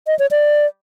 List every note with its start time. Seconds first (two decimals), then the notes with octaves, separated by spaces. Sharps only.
0.07 D#5
0.19 C#5
0.31 D5